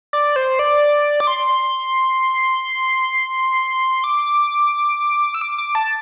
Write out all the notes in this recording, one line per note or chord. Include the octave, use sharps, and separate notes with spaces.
D5
C5
D5
D6
C6
D6
E6
D6
D6
A5